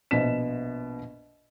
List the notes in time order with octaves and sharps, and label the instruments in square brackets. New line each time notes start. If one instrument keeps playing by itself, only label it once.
[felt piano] A#1 B2 C5 B6 E7